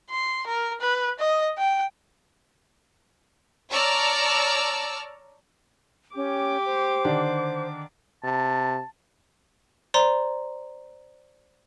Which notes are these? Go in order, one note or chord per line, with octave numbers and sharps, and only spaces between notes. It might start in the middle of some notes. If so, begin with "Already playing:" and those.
C6
A#4
B4
D#5
G5
C#5 D5 A5 A#5 E6 F6
C#4 G4 D6
C5
D3 D#3 D4
C3 A5
C5 D5 A#5 C6